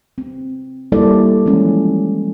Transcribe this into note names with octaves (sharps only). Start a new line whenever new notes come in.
C4
G3 A#3 E4 A4 C5 D5
E3 F3 G#3 C#4